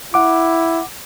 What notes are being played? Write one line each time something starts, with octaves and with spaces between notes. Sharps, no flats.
E4 F#5 D6